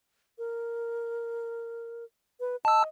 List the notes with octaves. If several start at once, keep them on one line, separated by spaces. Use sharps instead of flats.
A#4
B4
D#5 A5 E6